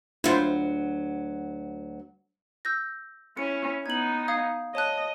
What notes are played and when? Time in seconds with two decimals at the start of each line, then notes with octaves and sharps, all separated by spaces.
0.24 D2 F#3 E4 F4 C5
2.65 E6 G6 A#6
3.37 C#4 E4 C#7
3.86 B3 D#4 G#6 F#7
4.28 F5 D#6 G#6
4.75 C#5 D#5 A5 F#6